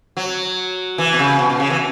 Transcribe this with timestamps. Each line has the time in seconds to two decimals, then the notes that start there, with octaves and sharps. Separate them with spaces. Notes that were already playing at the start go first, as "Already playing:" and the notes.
0.17 F#3
0.98 E3
1.13 B2
1.19 C#3
1.39 B2
1.50 B2
1.60 C#3
1.70 E3